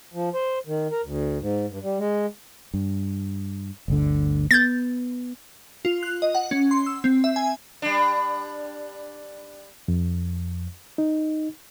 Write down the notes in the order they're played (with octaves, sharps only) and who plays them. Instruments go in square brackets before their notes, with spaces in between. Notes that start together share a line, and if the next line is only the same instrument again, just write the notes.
[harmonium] F3
C5
D#3
A#4
D2
G#2
G2
G3
G#3
[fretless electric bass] G2
G1 D2 D3
[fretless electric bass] B3 [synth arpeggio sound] G6 A6
[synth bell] F4
F#6
D#5
F#5
C#4
C6
E6
C4
E5
G#5
[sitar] G3 D4
[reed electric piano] F2
D#4